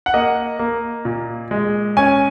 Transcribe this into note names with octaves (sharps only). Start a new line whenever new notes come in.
F#5
A#3 D#5
A#3
A#2
G#3
C#4 G#5